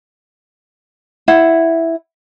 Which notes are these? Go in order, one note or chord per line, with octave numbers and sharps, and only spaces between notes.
E4 F#5